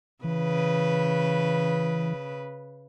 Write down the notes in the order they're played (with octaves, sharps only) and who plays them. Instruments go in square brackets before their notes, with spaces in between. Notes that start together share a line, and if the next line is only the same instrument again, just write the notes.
[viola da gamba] C#3 B4 [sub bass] E3